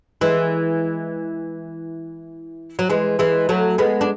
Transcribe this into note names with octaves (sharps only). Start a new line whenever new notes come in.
E3 G#3
F#3
E3 G#3
E3 G#3
F#3 A3
G#3 B3
D4